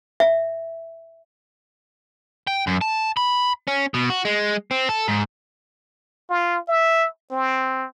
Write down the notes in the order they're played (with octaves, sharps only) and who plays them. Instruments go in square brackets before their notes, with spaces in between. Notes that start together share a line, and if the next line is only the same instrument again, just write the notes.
[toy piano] E5
[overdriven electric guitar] G5
F#2
A5
B5
C#4
B2
F#4
G#3
C4
A4
G#2
[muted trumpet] F4
E5
C4